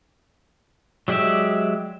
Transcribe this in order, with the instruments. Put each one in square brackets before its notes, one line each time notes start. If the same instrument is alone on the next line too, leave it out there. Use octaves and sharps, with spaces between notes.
[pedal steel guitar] F#3 G#3 G4 D5 E5